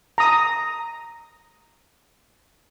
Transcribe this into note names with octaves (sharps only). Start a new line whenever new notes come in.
A#5 D#6